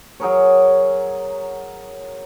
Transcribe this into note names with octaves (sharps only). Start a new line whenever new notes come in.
F#3 G#4 A#4 C#5